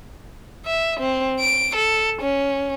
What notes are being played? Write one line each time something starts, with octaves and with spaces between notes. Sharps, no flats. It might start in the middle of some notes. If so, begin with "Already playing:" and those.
E5
C4
D7
A4
C#4